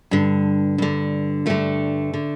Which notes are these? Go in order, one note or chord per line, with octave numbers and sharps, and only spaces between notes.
G2 D3
G2 D3
G2 D3 A3
D3